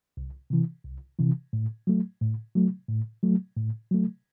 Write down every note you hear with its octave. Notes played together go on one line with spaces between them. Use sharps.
C2
C3 E3
C2
C3 E3
A2
F#3 A3
A2
F#3 A3
A2
F#3 A3
A2
F#3 A3